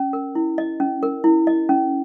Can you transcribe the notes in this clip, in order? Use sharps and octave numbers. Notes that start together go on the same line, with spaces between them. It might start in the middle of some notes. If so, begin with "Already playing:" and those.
Already playing: C#4
A#4
E4
D#5
C#4
A#4
E4
D#5
C#4